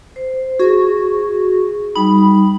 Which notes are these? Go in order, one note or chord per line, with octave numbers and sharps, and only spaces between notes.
C5
F#4 G#4
G3 D#4 B5